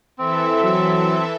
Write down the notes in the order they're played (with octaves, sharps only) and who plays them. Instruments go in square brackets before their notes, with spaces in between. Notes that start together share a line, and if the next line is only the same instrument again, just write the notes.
[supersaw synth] E3 A4 E5 [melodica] C4
[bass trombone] F#3